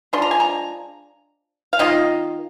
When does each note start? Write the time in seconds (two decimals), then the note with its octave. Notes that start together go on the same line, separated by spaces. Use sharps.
0.13 F3 G#3 D4 C6
0.22 A#5
0.31 G#5
0.40 A#5
1.73 F5
1.79 D#3 A#3 F4 D#5